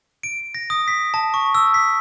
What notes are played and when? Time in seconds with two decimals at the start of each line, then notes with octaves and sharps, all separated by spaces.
0.23 D7
0.55 A#6
0.70 D#6
0.88 B6
1.14 A5
1.34 C#6
1.55 E6
1.74 B6